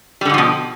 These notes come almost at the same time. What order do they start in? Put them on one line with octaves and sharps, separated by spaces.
G3 D3 G#2 F3 B2